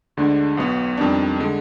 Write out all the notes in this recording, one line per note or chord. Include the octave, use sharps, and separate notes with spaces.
D2 D3 G#3 D4
B1 B2 B3
F2 D#3 G3 D4
D3 G#3